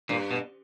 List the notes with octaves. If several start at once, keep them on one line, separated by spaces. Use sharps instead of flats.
G2 A#2
B2